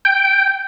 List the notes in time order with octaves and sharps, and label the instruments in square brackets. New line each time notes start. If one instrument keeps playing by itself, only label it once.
[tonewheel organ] G5